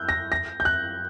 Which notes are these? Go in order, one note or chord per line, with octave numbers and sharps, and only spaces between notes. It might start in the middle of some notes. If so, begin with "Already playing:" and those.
Already playing: E6 F#6 G6
A#6
A#6
G6
F#6